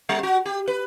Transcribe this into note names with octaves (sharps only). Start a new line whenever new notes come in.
G3
F#4
G4
B4